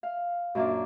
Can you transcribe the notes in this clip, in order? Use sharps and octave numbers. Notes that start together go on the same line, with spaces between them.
F5
F#2 A#2 A#3 D4 D5